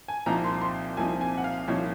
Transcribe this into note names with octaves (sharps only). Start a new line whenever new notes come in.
G#5
C2 A#2 F3 C4 D#4 A#5
C6
C6
C2 A#2 F3 C4 D#4 G#5
G#5
F#5
F5
C2 A#2 F3 C4 D#4 C#5